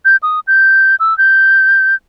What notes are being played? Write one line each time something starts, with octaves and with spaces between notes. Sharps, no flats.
G6
D#6
G6
E6
G6